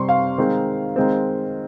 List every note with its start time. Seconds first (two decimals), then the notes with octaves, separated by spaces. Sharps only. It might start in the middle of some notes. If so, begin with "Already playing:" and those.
Already playing: C3 G3 C4 C6 C#6
0.09 F5
0.38 D#3 G#3 C4 D#4
0.96 D#3 G#3 C4